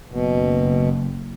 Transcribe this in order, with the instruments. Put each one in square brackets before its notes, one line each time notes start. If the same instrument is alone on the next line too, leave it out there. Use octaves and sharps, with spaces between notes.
[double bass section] F#1 [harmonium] B2